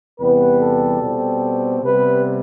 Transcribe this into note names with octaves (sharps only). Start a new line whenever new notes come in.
E2 C3 G3 B3 B4
A4
B2 G3 C4
C3 G3 B3 B4